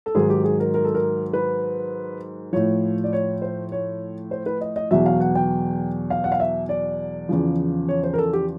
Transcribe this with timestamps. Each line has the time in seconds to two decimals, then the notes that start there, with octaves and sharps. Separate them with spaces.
0.06 A4
0.15 G#2 D#3 F#3 G#4
0.30 G4
0.44 G#4
0.60 A#4
0.74 A#4
0.85 A4
0.95 A#4
1.33 B4
2.53 A2 F3 C#5
3.04 D5
3.13 C#5
3.42 C5
3.72 C#5
4.31 C5
4.46 B4
4.61 D#5
4.76 D#5
4.91 E2 B2 F#3 E5
5.06 F5
5.20 F#5
5.35 G5
6.10 F5
6.24 F#5
6.32 F5
6.40 E5
6.69 D5
7.29 E2 C#3 F3
7.89 C#5
8.04 C5
8.14 A#4
8.18 A4
8.33 G4